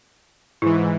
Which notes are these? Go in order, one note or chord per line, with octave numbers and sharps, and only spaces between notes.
G#2 E3 E4